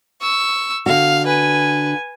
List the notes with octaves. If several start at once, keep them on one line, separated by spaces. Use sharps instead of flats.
C#6 E6
D3 F#4 F5
B4 G#5